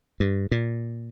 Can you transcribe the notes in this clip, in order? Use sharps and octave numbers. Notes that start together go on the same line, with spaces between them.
G2
A#2